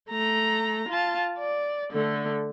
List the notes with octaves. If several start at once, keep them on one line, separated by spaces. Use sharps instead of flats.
A3 A#5
F4 A5
D5
D3 A3